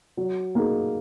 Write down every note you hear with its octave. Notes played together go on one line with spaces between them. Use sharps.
F#3
A#3 D#4 G#4